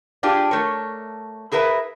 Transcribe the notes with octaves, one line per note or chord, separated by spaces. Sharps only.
D4 F4 G4 G#4
A3 A#4 C#5
E4 G#4 A#4 B4 E5